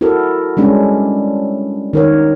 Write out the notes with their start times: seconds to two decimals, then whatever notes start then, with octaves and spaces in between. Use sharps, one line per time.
0.01 E4 F#4 A4 A#4
0.57 G3 G#3 C#4 D4
1.93 D#3 A#4 C#5